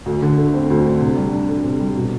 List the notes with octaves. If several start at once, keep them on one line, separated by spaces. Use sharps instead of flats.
D2
D3
A3
C4
D2
D3
C3
G3
D4
A4
C3
G3
B2